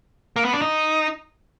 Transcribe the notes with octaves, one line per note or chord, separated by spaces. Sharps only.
A#3
B3
D4
D#4